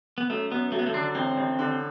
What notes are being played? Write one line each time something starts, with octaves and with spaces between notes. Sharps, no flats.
B3
F#2 A3
F#2 B3
F#3 A3
B3
A3
D3 D4
A1 C4
A1
D3